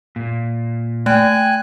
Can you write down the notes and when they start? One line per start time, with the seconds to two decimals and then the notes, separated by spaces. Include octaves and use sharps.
0.16 A#2
1.06 A3 G5 G#5 F#6